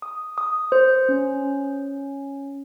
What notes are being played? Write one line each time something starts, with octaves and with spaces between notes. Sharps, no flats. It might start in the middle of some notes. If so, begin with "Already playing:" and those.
D#6
D#6
C5
C#4